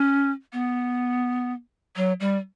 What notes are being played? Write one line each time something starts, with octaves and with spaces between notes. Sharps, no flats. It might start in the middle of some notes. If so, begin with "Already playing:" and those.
Already playing: C#4
B3
F#3
G3